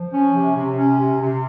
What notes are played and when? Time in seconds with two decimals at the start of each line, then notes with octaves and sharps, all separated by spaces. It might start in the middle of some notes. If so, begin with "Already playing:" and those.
Already playing: F3
0.12 C#4
0.34 C3
0.56 C3
0.77 C#4
0.99 C3
1.21 C3